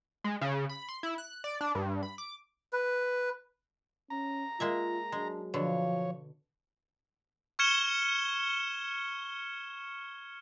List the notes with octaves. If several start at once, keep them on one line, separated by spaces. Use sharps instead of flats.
G#3
C#3
B5
C6
E4
F#6
D5
D4
G2
B5
D6
B4
C#4 A#5
G#3 A#3 F4 E5
F#3 G#3 D4
B2 D3 F3 C#5
C#6 F6 G#6 C#7 E7 G7